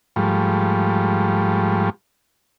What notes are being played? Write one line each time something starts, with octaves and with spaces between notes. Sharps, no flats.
G#2 F3 G3 A3